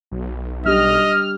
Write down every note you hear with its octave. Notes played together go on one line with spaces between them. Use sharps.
B1
G3 D4 G4 D#5 F6